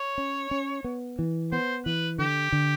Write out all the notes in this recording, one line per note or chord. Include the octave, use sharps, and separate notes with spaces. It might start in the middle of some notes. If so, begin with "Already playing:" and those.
Already playing: C#5
C#4
C#4
B3
E3
B3 C5
E3 B4
D3 G4
D3